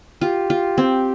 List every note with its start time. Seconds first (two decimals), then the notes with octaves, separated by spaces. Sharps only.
0.21 F4 G4
0.50 F4
0.78 C4